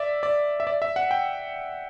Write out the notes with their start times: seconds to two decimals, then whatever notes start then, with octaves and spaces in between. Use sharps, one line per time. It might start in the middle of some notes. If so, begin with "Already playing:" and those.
Already playing: D5 E5
0.23 D5
0.60 E5
0.67 D5
0.82 E5
0.96 F#5
1.11 G5